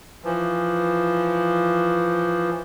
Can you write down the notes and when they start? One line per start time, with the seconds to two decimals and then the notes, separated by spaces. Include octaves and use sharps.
0.24 E3 F3